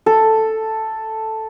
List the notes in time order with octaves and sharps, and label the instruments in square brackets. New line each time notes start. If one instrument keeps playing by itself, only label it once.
[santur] A4